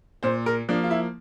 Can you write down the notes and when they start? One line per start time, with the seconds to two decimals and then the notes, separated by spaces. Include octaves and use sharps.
0.23 A#2 C5
0.46 A#4
0.69 F3 A#3 D4
0.84 F4
0.91 E4